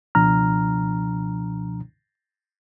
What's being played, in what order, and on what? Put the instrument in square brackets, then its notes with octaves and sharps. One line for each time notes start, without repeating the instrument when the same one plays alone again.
[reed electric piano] C#2 B2 F3 D4 A#5 F6